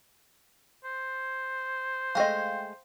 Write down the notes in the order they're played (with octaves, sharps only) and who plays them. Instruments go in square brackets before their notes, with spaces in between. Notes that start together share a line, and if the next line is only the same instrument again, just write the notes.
[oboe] C5
[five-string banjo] G#3 A3 D#5 [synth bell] F5 G5